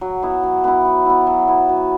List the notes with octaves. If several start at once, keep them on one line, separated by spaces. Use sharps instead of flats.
F#3
B3 E4
F#3
B3 E4
F#3
B3 E4
F#3
B3 E4
F#3